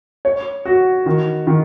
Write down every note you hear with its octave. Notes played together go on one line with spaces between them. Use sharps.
C#5
F#4
D#3
D#3